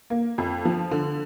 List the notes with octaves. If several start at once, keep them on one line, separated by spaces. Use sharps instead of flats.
A#3
F2
F3
D3